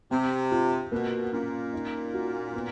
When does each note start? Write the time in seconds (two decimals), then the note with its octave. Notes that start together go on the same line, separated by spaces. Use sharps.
0.11 C3 C4
0.52 F4
0.92 B2 A#3
1.33 A#2 C#4
1.74 D#4
2.14 F#4
2.54 B3